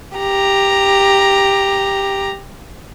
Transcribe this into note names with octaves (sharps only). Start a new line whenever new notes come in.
G4 A#5